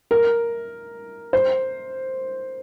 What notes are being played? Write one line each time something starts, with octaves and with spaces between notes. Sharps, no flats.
A#4
C5